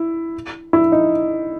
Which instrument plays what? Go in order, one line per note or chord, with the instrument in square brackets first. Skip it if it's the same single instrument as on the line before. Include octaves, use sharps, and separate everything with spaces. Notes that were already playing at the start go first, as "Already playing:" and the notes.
Already playing: [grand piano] E4
E4
D#4